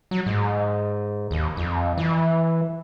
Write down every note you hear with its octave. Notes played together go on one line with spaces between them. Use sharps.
F#3
G#2
D#2
F2
E3